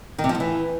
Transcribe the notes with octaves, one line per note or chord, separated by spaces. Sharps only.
D#3
C3
F3
A2
E3